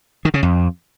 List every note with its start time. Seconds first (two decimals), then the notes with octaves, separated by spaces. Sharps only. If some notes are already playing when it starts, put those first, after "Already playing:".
0.25 D#3
0.34 C#3
0.43 F2